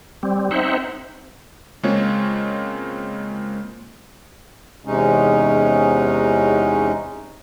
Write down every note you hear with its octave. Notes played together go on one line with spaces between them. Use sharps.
G3 C4
C4 D#4 C5 E5 F#5
C#3 G#3 A#3 C4 F4 C#5
E2 C3 G#3 C#4 D#4